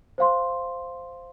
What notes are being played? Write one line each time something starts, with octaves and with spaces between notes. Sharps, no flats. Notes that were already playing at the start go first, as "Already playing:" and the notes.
C5 F5 C6